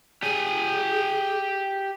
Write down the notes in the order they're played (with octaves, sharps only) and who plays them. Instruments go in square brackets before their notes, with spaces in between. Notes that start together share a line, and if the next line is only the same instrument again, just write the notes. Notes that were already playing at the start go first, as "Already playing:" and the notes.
[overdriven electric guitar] G4 G#5 [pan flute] G#4